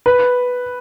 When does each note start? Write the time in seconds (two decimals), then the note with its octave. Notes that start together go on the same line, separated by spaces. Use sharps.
0.06 B4